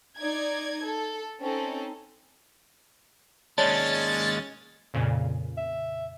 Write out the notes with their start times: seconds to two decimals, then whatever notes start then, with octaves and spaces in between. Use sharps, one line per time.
0.16 D#4 D5 G#6
0.84 A4
1.42 C4 C#4 D#4 A4
3.58 D#2 G#3 C#4 C#5 D5 A5 A6
4.94 F2 A#2 C#3
5.57 E5